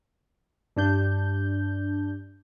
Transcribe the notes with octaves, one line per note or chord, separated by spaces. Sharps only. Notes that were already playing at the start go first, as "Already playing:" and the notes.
G2 D4 G6